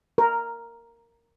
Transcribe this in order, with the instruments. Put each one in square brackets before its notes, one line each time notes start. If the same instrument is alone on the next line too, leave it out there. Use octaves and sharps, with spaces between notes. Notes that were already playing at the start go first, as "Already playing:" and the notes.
[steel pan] A#4